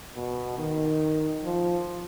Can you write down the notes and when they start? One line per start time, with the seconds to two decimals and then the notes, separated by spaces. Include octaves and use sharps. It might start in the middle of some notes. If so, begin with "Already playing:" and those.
0.16 B2
0.58 D#3
1.43 F3